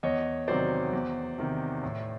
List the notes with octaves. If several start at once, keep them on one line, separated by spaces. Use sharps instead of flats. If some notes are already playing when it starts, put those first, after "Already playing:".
E2 C#5 D#5
C3 D#3 F#3 C5 D5
E2
C3 D#3
A2